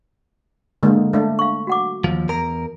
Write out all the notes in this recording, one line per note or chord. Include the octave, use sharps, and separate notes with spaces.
D3 G#3 A#3
A3 D4 A#4 E5 F5
F5 C#6
F#4 F#5 D6
D#2 F3
E2 A#4 A#5